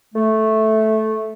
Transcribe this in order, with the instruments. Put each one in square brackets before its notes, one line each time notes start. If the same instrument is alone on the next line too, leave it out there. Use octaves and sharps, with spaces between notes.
[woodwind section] A3